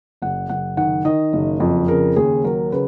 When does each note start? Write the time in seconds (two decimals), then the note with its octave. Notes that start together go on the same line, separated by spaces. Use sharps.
0.22 F#1 F#5
0.49 F#1 F#5
0.77 D#3 F#5
1.05 D#3 D#5
1.33 F#1
1.60 F2
1.88 C#3 A#4
2.16 D#2 G#4
2.44 F#3 A#4
2.72 C#3 B4